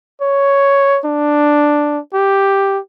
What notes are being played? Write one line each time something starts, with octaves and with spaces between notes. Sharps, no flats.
C#5
D4
G4